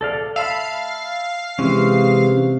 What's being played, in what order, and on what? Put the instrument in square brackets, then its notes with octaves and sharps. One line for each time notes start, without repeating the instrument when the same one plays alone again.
[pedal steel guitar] A4 D5 F5
[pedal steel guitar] E5 A5 B5 [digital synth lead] F5
[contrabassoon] C3 [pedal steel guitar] E3 G#3 C#4